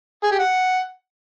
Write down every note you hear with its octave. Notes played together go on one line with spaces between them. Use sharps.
G#4
G4
F#5